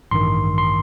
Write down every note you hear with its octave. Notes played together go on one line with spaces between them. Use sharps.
A1 G2 D#3 C6
C6